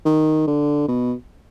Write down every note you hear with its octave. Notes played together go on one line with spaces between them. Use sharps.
D#3
D3
B2